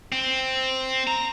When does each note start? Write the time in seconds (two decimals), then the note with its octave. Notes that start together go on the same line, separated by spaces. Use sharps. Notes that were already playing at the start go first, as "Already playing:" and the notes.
0.12 C4
1.07 A#5